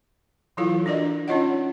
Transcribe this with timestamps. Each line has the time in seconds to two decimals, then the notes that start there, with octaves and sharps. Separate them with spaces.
0.57 E3 F#3 E4 F4 A4 F5
0.86 D4 F#4 A#4 D5 D#5
1.28 C#4 D#4 F4 C#5 D#5 F#5